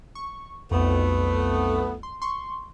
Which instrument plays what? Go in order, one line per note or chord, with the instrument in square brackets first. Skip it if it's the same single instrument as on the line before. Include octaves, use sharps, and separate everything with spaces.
[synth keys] C#6
[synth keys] B1 F2 [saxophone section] A3 B3
[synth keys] C6
C6 C#6